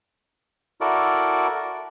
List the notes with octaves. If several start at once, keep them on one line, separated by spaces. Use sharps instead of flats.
E4 F#4 A4 A#4 D5